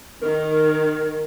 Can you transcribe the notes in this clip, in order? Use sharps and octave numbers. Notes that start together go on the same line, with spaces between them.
D#3 A#4